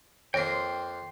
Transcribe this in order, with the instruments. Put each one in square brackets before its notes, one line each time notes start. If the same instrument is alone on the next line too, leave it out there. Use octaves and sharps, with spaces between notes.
[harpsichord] F2 A#3 [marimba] C#5 A#6 [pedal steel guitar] G5 C6